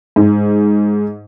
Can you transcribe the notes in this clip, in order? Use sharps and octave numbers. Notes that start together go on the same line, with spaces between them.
G#2